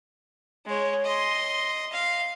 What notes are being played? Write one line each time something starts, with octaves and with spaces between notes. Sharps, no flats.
G#3 C#5
D#5 C6
F5